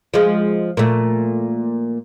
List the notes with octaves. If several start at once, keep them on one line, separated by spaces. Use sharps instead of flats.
F3 G#3
A#2 A3